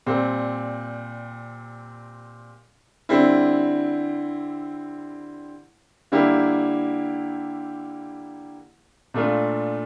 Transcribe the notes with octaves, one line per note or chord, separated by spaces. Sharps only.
A#2 G3 C4
D3 G3 C4 E4
D3 G3 A#3 E4 G4
A#2 A3 D4 F4